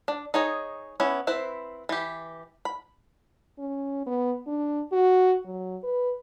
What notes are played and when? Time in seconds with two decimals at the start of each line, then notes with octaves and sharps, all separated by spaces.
0.08 D4
0.34 D#4 G#4 C#5 D#5
1.00 B3 C#4 E4
1.27 C4 E4 B4 C5
1.89 E3 G4
2.65 B5
3.59 C#4
4.07 B3
4.47 D4
4.92 F#4
5.45 F#3
5.84 B4